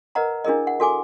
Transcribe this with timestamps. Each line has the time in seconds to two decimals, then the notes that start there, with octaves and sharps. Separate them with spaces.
0.15 A#4 B4 D#5 F#5 A#5
0.45 D4 E4 G#4 A#4 D#5
0.67 F#5
0.80 F#4 A4 G#5 D6